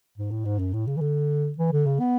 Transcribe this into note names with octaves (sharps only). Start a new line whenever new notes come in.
G#2
A2
G#2
F#2
A2
C#3
E3
D3
E3
D3
C#3
B3